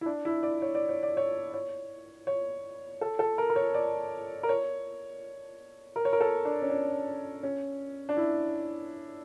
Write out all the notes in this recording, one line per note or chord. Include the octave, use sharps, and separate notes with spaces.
E4
D4
E4
D5
C#5
D5
C#5
D5
C#5
C#5
C#5
A4
A4
A#4
A#4
C#5
D5
A#4
C#5
A#4
C#5
A#4
A4
D4
C#4
D4
C#4
D4
E4